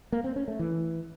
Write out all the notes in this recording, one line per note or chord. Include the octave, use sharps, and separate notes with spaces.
A#3
C4
C#4
A3
E3